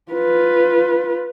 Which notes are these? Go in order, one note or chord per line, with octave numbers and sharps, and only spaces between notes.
F4 B4